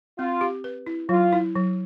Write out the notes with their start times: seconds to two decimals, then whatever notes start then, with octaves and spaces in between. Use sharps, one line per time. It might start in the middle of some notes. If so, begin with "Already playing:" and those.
0.18 C4 F4
0.41 G4
0.64 B4
0.86 E4
1.09 F#3 F4
1.32 E4
1.56 F#3